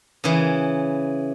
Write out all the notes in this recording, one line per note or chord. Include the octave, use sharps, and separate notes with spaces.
C#3 E3